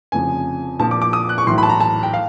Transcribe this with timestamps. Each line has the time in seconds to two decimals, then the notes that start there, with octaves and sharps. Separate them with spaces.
0.12 F1 F2 C#3 F3 G#5
0.79 A#1 A#2 F3 A5
0.91 D6
1.02 D6
1.13 D#6
1.29 F#6
1.38 C#6
1.46 B1 A2 E3 C6
1.58 B5
1.63 A5
1.69 A#5
1.80 A5
2.03 G5
2.14 F5